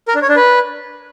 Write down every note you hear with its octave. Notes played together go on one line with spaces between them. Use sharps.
A#4
D4
C#5
D4
B4